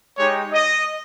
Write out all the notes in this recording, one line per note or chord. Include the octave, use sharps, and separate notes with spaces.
G#3 D#4 G4 C#5
D#5